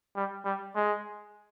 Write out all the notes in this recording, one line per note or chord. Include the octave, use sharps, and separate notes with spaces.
G3
G3
G#3